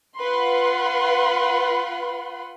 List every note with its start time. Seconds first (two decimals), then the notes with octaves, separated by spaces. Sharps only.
0.18 F4 B4 F#5 B5 C6